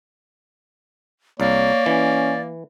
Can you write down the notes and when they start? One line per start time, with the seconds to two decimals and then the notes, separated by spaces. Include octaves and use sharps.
1.40 C2 A#3 C#5 D5
1.86 E3 C#4